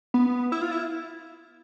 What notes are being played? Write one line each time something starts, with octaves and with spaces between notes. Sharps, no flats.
B3
E4
F4
E4